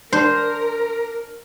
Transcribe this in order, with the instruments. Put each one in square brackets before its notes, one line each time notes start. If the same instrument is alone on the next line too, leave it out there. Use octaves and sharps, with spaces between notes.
[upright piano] D4 [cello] A#4 [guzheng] C5